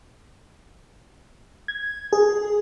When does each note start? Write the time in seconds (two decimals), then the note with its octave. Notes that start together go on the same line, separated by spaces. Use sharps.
1.68 G#6
2.13 G#4